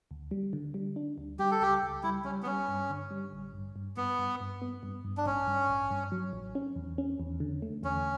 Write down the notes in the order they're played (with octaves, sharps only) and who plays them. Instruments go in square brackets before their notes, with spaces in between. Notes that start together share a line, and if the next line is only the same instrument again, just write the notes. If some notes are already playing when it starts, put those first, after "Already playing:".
[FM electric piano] D2
G3
D3
G3
D4
D2
[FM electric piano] G3 [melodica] G4
[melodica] A4
[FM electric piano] C#2 [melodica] G4
[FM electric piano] C#2
[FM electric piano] G3 [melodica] E4
[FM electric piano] G3 [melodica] C#4
[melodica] B3
[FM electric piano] G3 [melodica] C#4
[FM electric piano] G2
D3
G3
A1
G2
G2
[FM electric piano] G2 [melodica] B3
[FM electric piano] G2
G2
B3
G2
G2
[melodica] D4
[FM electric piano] A1 [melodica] C#4
[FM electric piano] G2
A1
G2
F#3
A1
C#4
E2
C#4
E2
D3
A3
[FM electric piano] E2 [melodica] C#4